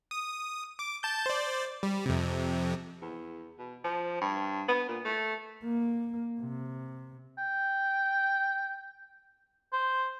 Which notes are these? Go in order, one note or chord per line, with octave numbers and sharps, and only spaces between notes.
D#6
D6
A5 G6
C5 D5
G3
F2 C3
E2
B2
F3
G2
B3
A#2
A3
A#3
C3
G5
C5